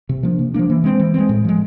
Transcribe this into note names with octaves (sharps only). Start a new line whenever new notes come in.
C3
F3 A#3 D4
C3
F3 A#3 D4
E3
G#3 C4
E3
G#3 C4
A2
F3 G#3